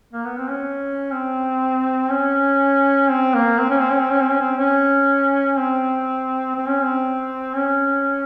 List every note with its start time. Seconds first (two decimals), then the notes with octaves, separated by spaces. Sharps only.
0.13 A#3
0.25 B3
0.38 C4
0.49 C#4
1.12 C4
2.11 C#4
3.10 C4
3.34 A#3
3.59 C4
3.69 C#4
3.80 C4
3.91 C#4
4.00 C4
4.11 C#4
4.20 C4
4.31 C#4
4.41 C4
4.57 C#4
5.57 C4
6.56 C4
6.68 C#4
6.82 C4
7.54 C#4